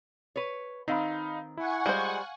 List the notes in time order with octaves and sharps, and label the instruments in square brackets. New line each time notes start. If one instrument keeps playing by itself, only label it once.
[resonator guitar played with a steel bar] B4 C#5
[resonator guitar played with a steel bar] D#3 C4 [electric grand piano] D#4 F5 B5
[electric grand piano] E4 [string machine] F#5 G#5 C#6
[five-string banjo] G3 C5 [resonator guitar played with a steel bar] G#3 F4 [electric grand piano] F5